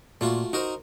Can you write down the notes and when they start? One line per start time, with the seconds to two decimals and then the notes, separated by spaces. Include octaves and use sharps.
0.21 A#2 A3 F4 F#4
0.53 D#4 F#4 A#4 C5